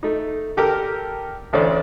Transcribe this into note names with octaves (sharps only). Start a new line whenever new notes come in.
A3 D#4
D3 G4 A4 A#4
A1 D2 A3 C#4 C5 D5